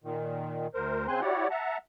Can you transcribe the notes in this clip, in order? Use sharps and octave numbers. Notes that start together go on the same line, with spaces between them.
A#2 D#3
D2 A#4 C5
C#3 C4 C5 G#5 C6 F#6
E4 F#4 G4 C#5 D5 F#5
E5 F#5 A5 A#5